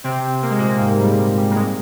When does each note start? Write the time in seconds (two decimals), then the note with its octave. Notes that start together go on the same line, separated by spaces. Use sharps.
0.04 C3 C4
0.42 A#3
0.50 G#3
0.59 A#2 A#3
0.80 G#2 G#3
0.99 G3
1.19 G3
1.37 G3
1.51 A#3
1.56 G#2 G#3